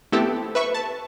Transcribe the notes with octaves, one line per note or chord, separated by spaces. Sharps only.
A3 B3 C4 E4 G4 A4
B4 E5 C#6
A5